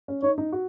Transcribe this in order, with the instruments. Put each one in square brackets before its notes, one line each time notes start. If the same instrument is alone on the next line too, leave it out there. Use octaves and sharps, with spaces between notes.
[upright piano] C#4
[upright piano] D#4 [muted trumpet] C#5
[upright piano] D#4
F#4